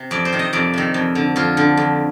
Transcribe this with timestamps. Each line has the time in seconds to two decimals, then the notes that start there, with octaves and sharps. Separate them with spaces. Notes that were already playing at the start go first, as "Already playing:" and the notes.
Already playing: C3
0.11 F2 D5
0.25 C5
0.33 C3 D#3
0.39 D#5
0.53 F2 D5
0.74 C3 D#3
0.94 F2
1.15 D3
1.36 F2 F4
1.57 D3
1.77 F2